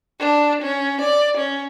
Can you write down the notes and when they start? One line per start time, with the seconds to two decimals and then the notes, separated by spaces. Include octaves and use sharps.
0.20 D4
0.62 C#4
1.02 D5
1.38 C#4